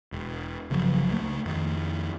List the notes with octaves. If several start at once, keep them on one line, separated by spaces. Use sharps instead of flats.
E1
G1 C#3 F3 F#3
C#2 G3 A3
F2 D#3